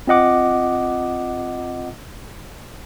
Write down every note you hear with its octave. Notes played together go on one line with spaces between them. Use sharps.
C4 F4 D#5 F#5 D6